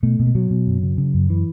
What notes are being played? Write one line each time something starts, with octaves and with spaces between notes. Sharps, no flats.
B2 A3
B2
A3
B2 F#3
B2
F#2
C#3
C#3
F#2
E3